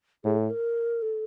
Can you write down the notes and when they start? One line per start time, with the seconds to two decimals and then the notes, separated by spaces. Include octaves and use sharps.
0.24 A2 G#4
0.38 A4
0.50 A#4
1.02 A4